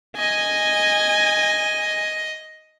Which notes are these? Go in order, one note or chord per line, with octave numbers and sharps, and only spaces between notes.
D#5 G#5